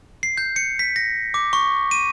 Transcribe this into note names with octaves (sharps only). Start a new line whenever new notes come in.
C7
G6
C#7
B6
A#6
D6
C#6
D#7